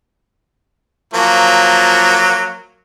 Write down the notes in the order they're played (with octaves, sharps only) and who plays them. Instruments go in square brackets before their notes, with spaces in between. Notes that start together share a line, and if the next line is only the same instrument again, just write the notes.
[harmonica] F3 F#3 A#3